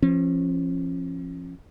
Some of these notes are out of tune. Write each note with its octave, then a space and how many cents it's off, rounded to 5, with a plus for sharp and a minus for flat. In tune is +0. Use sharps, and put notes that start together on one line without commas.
F3 -25 C#4 -35